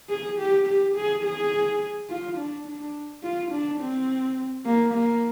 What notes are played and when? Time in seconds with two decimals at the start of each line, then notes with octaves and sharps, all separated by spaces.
0.10 G#4
0.39 G4
0.67 G4
0.96 G#4
1.24 G#4
2.09 F4
2.38 D4
2.67 D4
3.24 F4
3.52 D4
3.81 C4
4.66 A#3
4.94 A#3